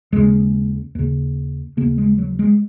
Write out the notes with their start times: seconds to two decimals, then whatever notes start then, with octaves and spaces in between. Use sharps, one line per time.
0.12 D#2 C#3 G#3
0.95 D#2 C#3
1.77 D#2 C#3 A#3
1.98 G#3
2.18 F#3
2.39 G#3